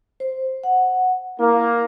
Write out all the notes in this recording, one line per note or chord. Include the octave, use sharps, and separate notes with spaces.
C5
F#5
A#3 E4